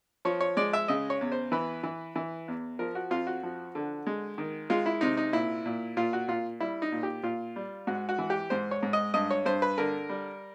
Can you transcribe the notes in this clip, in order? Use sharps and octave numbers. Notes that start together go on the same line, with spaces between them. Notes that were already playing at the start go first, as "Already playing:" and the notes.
F3 C#5
C#5
G#3 D5
E5
C#3 D#5
C#5
E2
C5
E3 B4
E3
E3
E2
F3 A#4
F#4
F2 F4
F#4
F3
D3
G#3
D#3
G#3 F4
E4
C3 D#4
D#4
A#2 E4
A#2
A#2 F4
F#4
A#2 F4
G3 E4
D#4
A#2
G4
A#2 F4
G3
G#2 F#4
F#4
E3
G4
G#2 C5
C#5
G#2
D#5
G2 D#5
C#5
G2 C5
B4
D3 A#4
G3